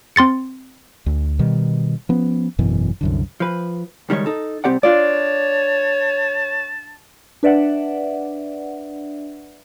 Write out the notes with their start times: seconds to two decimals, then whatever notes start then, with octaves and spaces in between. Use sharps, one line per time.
0.16 C4 C6 A6 C#7
1.06 D2
1.39 B2 D#3 G3
2.09 F3 B3 C#4
2.58 G#1 F#2 B2 E3
3.01 C2 F#2 D3
3.40 F3 B4
4.09 C#2 D#3 G3 G#3 C#5
4.26 D#4 A4
4.64 C2 F#3 C4 G4 D5 F#5
4.83 D4 F4 C#5 D5 A5
7.43 D4 B4 D5 E5 F#5